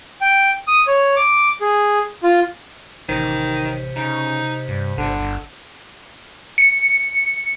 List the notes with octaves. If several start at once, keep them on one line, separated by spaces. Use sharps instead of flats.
G5
D#6
C#5
D6
G#4
F4
A1 C3 D#3 C5
C#3 D#4
G2
G1 D3
G1
C#7